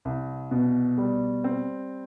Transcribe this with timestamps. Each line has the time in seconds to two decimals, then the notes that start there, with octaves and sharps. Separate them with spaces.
0.05 C2
0.51 B2
0.98 G3
1.44 C4